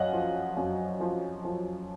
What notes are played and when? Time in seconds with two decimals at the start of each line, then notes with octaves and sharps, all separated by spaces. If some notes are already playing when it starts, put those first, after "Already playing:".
Already playing: F#2 C#5 D#5 F5 F#5
0.13 F3
0.57 F#2
1.00 F3
1.45 F3